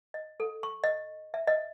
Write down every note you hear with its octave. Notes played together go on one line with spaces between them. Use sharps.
D#5
A4
C#6
D#5
E5
D#5